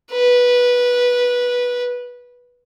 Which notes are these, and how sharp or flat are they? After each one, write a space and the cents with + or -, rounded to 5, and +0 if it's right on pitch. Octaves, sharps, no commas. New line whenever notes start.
B4 -15